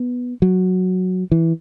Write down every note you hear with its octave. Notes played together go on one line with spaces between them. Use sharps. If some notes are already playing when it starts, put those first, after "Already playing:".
Already playing: B3
F#3
E3